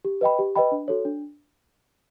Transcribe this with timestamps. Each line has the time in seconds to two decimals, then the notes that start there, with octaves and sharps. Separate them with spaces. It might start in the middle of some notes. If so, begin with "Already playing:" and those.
0.05 G4
0.21 B4 D#5 G5 B5
0.39 G4
0.55 B4 D#5 G5 B5
0.72 D4
0.88 F#4 A4 C#5
1.05 D4